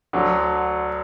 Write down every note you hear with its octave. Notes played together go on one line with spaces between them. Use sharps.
D2 D3 F#3